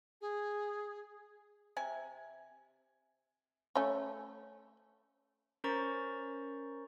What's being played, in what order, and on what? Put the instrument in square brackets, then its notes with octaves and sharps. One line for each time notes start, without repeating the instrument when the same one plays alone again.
[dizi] G#4
[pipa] C3 G#5
[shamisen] A3 C#4
[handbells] C#4 A#4 C5 A#5 C#6 A6